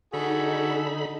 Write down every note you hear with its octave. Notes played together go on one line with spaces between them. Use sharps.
D3 D#4 F#4 G#4 A4 B5